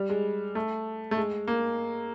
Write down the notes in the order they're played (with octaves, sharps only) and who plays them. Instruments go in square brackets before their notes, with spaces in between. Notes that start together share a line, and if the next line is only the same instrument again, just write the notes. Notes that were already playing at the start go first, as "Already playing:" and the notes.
Already playing: [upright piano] G3
G#3
A3
A3
G#3
A#3